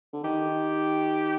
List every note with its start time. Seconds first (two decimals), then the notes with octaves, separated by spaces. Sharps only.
0.13 D3
0.24 D#3 G4